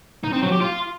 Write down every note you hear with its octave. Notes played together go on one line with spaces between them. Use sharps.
D#4
C4
F#3
G4
F4